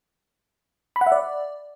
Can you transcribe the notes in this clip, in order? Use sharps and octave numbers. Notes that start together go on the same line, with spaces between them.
B5
F#5
E5
D5